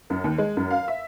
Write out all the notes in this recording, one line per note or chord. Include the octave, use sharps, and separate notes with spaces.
F#2
D#2
G#3
F#2
F5
E5